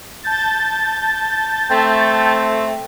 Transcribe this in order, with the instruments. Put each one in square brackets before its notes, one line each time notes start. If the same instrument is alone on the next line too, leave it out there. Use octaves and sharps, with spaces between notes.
[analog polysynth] A5 G6 A6
[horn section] A3 [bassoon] C4